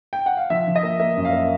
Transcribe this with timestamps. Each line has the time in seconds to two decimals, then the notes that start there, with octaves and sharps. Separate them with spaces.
0.13 G5
0.26 F#5
0.37 F5
0.50 F3 E5
0.67 F3
0.76 D#5
0.83 A#3
0.99 A#3 E5
1.17 F#2
1.25 F5
1.33 A#3